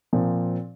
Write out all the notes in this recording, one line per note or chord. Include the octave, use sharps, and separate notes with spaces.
A#2 F3 C4